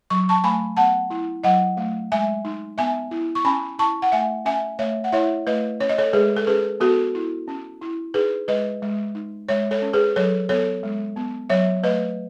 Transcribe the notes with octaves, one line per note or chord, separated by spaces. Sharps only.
F#3 C#6
A5 C#6
A3 G#5 B5
B3 F#5 A5
E4
F#3 D#5 F#5
A3
G#3 E5 G#5
D#4
B3 E5 G#5
E4
C#6
C#4 G#5 B5
E4 A5 C#6
F#5
A3 E5 G#5
C#4 E5 G#5
A3 C#5 E5
F#5
E4 C#5 E5
A3 B4 D#5
C#4 C#5
D#5
A4 C#5
G#3 G#4 B4
A4
C#4 G#4 B4
B3 F#4 A4
E4
C#4
E4
D#4 G#4 B4
G#3 B4 D#5
G#3
D#4
G#3 C#5 E5
A4 C#5
C#4
G#4 B4
F#3 A4 C#5
B3 A4 C#5
G#3
B3
F#3 C#5 E5
A3 B4 D#5